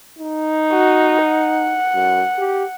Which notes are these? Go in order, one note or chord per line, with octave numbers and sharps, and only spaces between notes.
D#4
F#4
F#5
F#2
G4